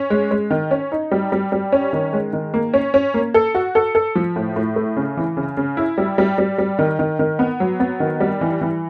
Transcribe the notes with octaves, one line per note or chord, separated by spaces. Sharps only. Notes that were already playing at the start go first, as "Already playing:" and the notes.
Already playing: C#4
G#3
G#3
D#3
C#4
D#4
G3
G3
G3
C#4
D#3
G#3
D#3
A#3
C#4
C#4
A#3
A4
F#4
A4
A4
F3
A2
A2
A3
C#3
E3
C#3
C#3
E4
G3
G3
G3
G3
D#3
D#3
D#3
B3
F#3
B3
D#3
G3
E3
E3